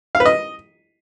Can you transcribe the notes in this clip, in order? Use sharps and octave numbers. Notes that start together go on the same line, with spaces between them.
F5
B4
D#5